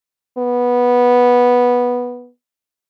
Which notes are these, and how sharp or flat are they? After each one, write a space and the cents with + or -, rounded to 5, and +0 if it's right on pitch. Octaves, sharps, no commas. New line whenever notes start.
B3 -10